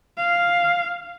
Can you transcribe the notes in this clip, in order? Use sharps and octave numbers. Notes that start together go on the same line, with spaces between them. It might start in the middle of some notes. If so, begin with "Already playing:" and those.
F5